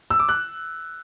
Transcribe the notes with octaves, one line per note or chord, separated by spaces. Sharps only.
E6
D6
F#6